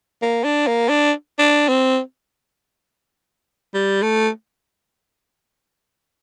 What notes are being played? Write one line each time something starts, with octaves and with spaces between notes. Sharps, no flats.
A#3
D4
A#3
D4
D4
C4
G3
A3